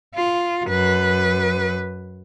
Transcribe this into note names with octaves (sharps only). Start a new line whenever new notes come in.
F4
F#2 B4